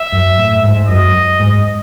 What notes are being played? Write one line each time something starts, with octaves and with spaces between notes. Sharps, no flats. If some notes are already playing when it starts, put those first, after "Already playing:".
Already playing: E5
F#2
A2
G#2
F#2 D#5
G#2